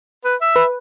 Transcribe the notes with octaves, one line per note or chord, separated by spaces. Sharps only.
B4
E5
B4